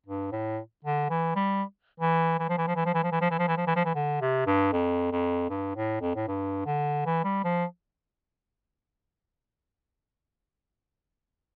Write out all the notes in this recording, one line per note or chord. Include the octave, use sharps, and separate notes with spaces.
G2
A2
D3
E3
G3
E3
E3
F3
E3
F3
E3
F3
E3
F3
E3
F3
E3
F3
E3
F3
E3
F3
E3
D3
C3
G2
F2
F2
G2
A2
F2
A2
G2
D3
E3
G3
F3